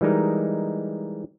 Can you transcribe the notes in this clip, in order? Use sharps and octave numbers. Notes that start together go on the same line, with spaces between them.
E3 G3 G#3 D#4 A#4